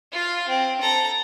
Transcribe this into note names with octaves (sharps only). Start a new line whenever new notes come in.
F4 F5
C4
A4 A#5